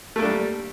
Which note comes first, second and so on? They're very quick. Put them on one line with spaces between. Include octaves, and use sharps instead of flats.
A3 A#3 D4 G3